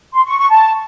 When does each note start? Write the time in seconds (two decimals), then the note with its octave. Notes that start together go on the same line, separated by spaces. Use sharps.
0.14 C6
0.26 C#6
0.38 C#6
0.50 A5